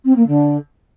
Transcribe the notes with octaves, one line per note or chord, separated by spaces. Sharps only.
C4
A#3
D3